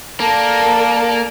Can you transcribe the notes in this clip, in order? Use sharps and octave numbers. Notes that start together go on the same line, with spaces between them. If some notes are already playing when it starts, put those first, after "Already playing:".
A#3 A4 A#4 D5 A5